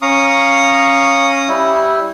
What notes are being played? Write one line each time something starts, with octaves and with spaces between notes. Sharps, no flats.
C#4 F5 A#5 C#6 D#6
G3 E4